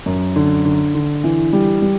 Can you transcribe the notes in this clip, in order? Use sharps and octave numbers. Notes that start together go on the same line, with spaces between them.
F#2
D3
D3
D3
E3
G3
G3